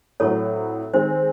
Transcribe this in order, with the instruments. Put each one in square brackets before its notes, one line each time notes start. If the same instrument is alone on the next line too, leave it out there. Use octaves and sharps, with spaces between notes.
[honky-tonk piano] A2 F#3 C4 [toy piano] A4 C#5
[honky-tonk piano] D#3 G#3 C4 [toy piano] C5